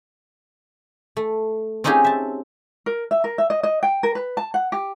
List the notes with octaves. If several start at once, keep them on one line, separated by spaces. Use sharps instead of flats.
A3
C4 C#4 D#4 F4 G4 G#4
E5 A5
A#4
E5
A#4
E5
D#5
D#5
G5
A#4
B4
A5
F#5
G4